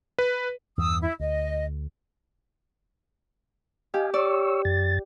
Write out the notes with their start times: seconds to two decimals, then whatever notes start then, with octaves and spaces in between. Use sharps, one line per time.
0.19 B4
0.78 E2 G2 E3 D#6 E6
1.01 E4 E5
1.20 D2 D#5
3.94 G4 D#5 F5 G#5
4.14 C#5 D5 C#6 E6
4.65 F#2 A6